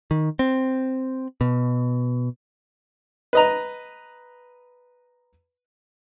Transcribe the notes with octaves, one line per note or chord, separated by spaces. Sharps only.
D#3
C4
B2
B4 D#5 A#5